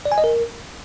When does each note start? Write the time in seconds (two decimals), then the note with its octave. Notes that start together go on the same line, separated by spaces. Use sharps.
0.05 D5
0.12 G#5
0.18 D#5
0.24 A#4